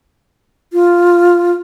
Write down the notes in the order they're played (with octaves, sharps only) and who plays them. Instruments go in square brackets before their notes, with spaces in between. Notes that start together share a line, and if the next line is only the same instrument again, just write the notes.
[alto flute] F4